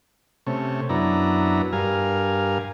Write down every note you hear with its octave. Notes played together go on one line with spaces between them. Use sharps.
C3 A3 C#4
F#2 B3 D4 E4 A#5
G2 A#4 F5 G#5